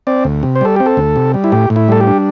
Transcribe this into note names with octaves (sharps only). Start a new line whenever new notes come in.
C4 D5
D2
C3
C5
G3 A4
C4 G4
A4
D2
C3
G3
E4
A2 G4
A2
E4
G3 A4
G4
D4